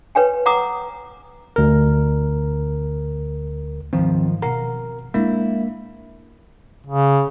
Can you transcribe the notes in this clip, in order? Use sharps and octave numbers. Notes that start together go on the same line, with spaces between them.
B4 C#5 G5 G#5
F#5 A#5 D6 D#6
D2 A#4
G#2 D#3 F3 F#3 C4
B2 A#4 F5 F#5 A#5
G#3 A#3 D4 E4
C#3